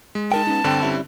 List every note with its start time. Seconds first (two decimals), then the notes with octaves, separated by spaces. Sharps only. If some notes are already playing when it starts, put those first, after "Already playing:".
0.15 G#3
0.32 D#4 A#4 G5 A5
0.47 B3 C#4 D#4
0.64 G2 D3 C4 D4 G5
0.82 G3 C#4 E4